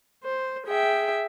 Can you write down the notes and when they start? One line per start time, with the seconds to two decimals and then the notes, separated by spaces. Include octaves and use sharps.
0.23 C5
0.66 G#4 E5 G5